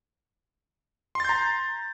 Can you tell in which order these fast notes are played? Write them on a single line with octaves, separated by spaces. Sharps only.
C6 A6 G6 A#5